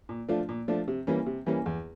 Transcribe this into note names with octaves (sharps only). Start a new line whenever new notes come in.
A#2
F3 A3 D4 F4
A#2
F3 A3 D4 F4
C3
E3 G3 A#3 C#4
C3
E3 G3 A#3 C#4
E2